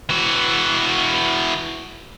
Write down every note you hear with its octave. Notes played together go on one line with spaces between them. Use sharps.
E3 F#4